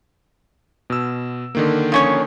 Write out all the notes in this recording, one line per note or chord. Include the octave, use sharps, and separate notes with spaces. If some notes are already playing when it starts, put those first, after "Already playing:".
B2 E6
D3 D#3 A#3
F3 C#4 C#5